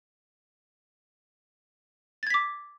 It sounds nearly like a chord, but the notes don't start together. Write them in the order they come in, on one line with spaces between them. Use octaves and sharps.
A6 G#6 B6 D6